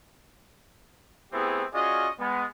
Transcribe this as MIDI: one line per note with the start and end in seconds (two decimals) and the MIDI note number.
1.32 1.63 57
1.32 1.63 59
1.32 1.63 60
1.32 1.63 64
1.32 1.63 67
1.32 1.63 68
1.73 2.08 61
1.73 2.08 65
1.73 2.08 66
1.73 2.08 68
1.73 2.08 74
1.73 2.08 75
2.19 2.44 56
2.19 2.44 59